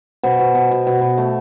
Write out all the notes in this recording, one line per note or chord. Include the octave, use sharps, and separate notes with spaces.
B2 C5
B2
B2
B2
B2
B2
A3